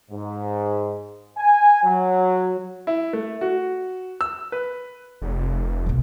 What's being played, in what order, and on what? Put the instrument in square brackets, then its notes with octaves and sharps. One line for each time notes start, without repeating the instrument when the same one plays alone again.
[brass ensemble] G#2
G#5
F#3
[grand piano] E4
A3
F#4
E6
B4
[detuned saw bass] F1
[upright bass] C2 B2